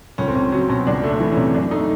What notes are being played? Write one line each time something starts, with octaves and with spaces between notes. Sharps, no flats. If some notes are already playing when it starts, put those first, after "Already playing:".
C#2 C#4
C4
C#2 C#4
F#3 C#4
B2 C#4
C#2 D4
A3
D4
E3
C3 C#4
F#2 D4
A3 D#4